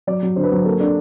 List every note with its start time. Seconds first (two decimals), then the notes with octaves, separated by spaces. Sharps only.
0.07 F#3 D5
0.23 F#3
0.36 D3 C5
0.44 B4
0.51 F#3 C5
0.66 A#3 A4
0.80 D4 A4